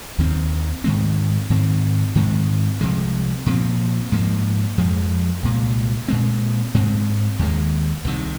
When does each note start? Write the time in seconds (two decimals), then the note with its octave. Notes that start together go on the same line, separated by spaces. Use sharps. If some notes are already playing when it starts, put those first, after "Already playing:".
0.18 D#2 D#3 C4
0.84 G#2 D#3 G#3 C4
1.50 G#2 D#3 C4
2.15 G#2 D#3 G#3 C4
2.81 C2 C3 F3 G#3
3.46 A#2 F3 C4
4.12 G#2 F3 A#3
4.78 F2 F3 G#3
5.43 C2 A#2 G#3
6.08 A#2 G#3 C4
6.74 G#2 G#3 C4
7.39 D#2 D#3 G#3
8.05 C2 C3 D#3